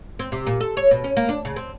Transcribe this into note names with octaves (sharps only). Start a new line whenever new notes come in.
C4
C3
A#2
A4
C#5
B2
C#4
A#3
D4
C#3
C4